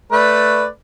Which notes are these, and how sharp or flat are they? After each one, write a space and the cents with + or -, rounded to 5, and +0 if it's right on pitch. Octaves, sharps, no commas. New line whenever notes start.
A3 +0 B4 +0 D5 +0